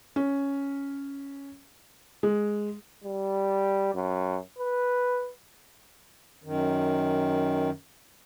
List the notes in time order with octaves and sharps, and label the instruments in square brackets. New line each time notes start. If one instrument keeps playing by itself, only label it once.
[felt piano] C#4
G#3
[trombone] G3
F#2
B4
[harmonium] F#2 D#3